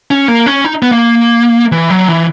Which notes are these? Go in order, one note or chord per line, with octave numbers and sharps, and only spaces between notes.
C#4
A#3
C#4
D#4
B3
A#3
E3
F#3
E3